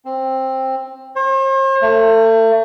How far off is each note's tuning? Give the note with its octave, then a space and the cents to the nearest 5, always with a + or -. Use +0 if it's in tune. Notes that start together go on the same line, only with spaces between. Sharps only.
C4 +10
C5 +45
A3 +35